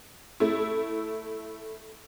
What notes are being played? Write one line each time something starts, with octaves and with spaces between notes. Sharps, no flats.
A3 E4